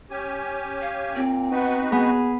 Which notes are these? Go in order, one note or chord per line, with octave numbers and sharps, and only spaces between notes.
C#4 G4 G#5
F5
A#2 C4
B3 D#4 F#4 B4
B3 G#4